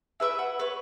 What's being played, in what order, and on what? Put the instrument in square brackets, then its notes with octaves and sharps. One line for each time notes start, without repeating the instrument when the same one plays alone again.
[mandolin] E4 B4 E5 E6
F#5
B4 C#5